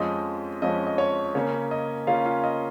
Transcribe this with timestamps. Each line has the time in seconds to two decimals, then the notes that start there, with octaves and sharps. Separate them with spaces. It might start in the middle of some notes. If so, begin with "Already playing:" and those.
Already playing: F2 F3 G#3 C#4 D#5 D#6
0.62 F2 F3 G#3 C#4 D#5
0.87 D#5
0.98 C#5
1.35 C#3 A#3 C#4 C#5
1.71 D#5
2.07 C#3 A#3 C#4 F4 F5
2.26 F4 F5
2.44 D#5